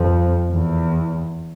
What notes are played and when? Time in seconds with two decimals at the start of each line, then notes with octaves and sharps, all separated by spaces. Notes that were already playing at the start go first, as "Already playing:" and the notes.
Already playing: F2
0.52 E2